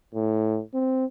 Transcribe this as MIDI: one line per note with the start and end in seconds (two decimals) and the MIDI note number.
0.15 0.60 45
0.74 1.05 60